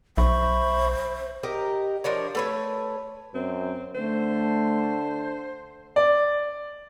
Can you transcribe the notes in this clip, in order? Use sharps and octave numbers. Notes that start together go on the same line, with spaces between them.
B1 C5 E5 B5 C#6
G4 A#4 D#5
F3 D4 A#4 C#5
A3 B4 C#5
F#2 C4
D3 A3 C5
D5